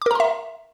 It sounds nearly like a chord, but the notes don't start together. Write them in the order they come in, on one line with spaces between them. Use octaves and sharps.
D6 A#4 A#5 C6 E5